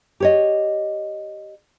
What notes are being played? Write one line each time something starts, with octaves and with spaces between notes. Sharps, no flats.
G4 C#5 D#5